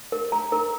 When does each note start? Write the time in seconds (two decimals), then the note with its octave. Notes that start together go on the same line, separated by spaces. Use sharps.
0.12 A#4
0.32 A#5
0.52 A#4